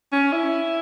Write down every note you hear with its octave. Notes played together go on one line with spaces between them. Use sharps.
C#4
E4